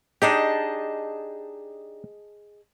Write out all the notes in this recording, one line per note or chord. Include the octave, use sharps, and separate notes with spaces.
D4 D#4 G4 G#4 D#5 A5